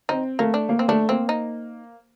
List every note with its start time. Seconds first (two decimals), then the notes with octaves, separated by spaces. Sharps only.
0.09 C4 D#4
0.39 A3 A#3
0.54 D4
0.69 A#3
0.79 C4
0.88 A3 D4
1.09 A#3 C4
1.29 D#4